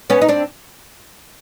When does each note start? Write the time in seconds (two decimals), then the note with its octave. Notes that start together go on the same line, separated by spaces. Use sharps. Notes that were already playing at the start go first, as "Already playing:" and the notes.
0.10 B3 C#4
0.21 D#4
0.28 C4 D4